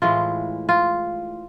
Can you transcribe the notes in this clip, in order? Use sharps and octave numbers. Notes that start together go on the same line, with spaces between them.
A2 E3 G#3 F4
F4